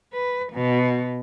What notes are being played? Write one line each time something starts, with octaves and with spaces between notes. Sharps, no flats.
B4
B2